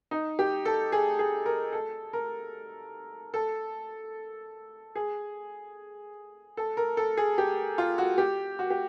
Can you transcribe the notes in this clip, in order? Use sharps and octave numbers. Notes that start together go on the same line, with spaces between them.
D#4
G4
A4
G#4
G#4
A#4
A4
A#4
A4
G#4
A4
A#4
A4
G#4
G4
F4
F#4
G4
F#4
G4